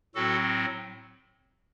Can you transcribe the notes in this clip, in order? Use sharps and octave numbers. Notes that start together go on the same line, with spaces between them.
A2 F#3 C4 F#4 A4